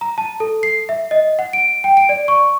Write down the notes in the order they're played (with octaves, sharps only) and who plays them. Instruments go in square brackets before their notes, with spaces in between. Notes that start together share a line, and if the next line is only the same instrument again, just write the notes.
[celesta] A#5
A5
A4
C7
E5
D#5
F#5
D7
G5
D7
D5
C#6